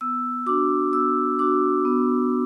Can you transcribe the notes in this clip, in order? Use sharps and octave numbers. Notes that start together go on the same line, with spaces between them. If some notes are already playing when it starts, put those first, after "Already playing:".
B3 E6
D4 F#4 D6
B3 E6
D4 F#4 D6
B3